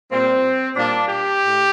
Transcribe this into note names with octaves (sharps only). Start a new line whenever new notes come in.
A#2 G3 A#3 C4
A#2 G3 A#3 D4
G4
A2